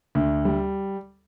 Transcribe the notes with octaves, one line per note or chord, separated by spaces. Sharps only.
D2
G3